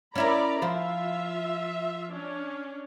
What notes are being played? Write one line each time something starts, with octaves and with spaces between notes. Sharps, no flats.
C#4 E4 A#4 D5 A#5 B5
F3 F4 C5 E5
C#4 D4